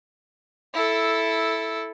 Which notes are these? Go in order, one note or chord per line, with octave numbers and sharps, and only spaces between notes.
E4 A4